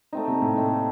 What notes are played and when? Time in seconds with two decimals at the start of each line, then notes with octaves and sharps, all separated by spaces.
0.13 A3 C4 D#4
0.28 C3
0.42 A2
0.57 A3 C4 D#4